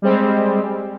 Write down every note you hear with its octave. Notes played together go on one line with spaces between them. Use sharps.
G3 G#3 C4